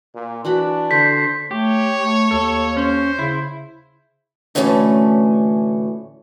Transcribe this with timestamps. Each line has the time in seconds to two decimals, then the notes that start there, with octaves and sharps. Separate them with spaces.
0.15 A#2
0.45 E3 D4 F#4 B5
0.91 D3 C5 B6
1.51 A3 G4 C#5
1.99 A3
2.31 D#2 A4
2.77 C#4 C5
3.19 C#3 E4
4.55 D2 A2 E3 A3 C4 C#4